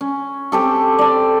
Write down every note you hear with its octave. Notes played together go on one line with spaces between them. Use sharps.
C#4
C4 G4 A4
A4 D5